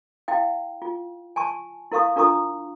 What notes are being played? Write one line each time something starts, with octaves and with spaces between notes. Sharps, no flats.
E4 F5 G5
F4
G#5 A5 C#6
E4 A#4 F5 C#6 D#6
D4 F4 A#4 A#5 C#6 D#6